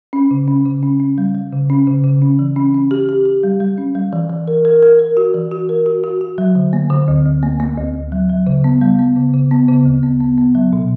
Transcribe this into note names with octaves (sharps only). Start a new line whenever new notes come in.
C#4
C#3
C#4
C#3
C#4
C#4
G3
G3
C#3
C#4
C#3
C#3
C#4
E3
C#4
C#4
G4
G4
G4
G3
G3
C#4
G3
E3
E3
A#4
A#4
A#4
A#4
F#4
E3
F#4
A#4
F#4
F#4
F#4
F#3
D3
A#3
D3
D2
D2
A#3
A#3
D2
D2
F#3
F#3
C#3
B3
G3
B3
C#3
C#3
B3
C#3
D2
B3
B3
B3
F#3
B2